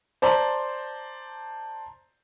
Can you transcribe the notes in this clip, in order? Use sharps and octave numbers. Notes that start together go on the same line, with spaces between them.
C5 D5 A5 A#5 C6